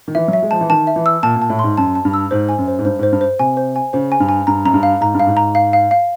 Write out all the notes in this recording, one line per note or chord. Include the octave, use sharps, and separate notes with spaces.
D#3
E3 E5
F#3
E5
G#3
F3 A5
E3
D#3 A5
E5
E3
E6
A#2 A5
A#2
A5
A2
G#2 C6
F#2 A5
A5
G2
E6
G#2 C5
G#5
F#2
C5
G#2
G2 C5
G#2 C5
G2
C5
C3 G#5
C5
G#5
C#3 C5
G#5
G2
G#5
G2 A#5
F#2 A#5
G2
F5
G#2 A#5
G2
F5
G#2
A#5
F5
F5
F5